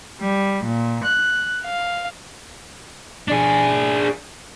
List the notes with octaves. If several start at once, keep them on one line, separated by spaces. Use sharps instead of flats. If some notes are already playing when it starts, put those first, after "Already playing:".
G3
A#2
F#6
F5
D4 G#4